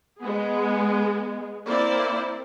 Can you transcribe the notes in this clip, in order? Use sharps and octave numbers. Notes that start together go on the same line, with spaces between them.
G#3 B3 G#4
A#3 C4 E4 C5 D5